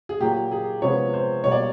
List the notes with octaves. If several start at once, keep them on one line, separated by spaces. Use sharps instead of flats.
G#4
A#2 F#3 A#3 G4
G#4
C3 F3 G#3 B3 C#5
C5
B2 G3 A#3 C#5
D5